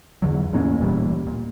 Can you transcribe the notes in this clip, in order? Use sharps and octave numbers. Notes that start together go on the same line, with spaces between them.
E2 D3 F#3
E2 A2 A#3 C#4
D1 A1 A#2 G3
A#2